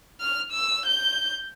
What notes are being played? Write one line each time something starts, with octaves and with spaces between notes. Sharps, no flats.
F6
E6
G6